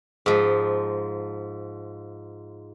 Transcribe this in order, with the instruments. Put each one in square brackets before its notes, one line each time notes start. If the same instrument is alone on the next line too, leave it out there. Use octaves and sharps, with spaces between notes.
[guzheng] G#2 F3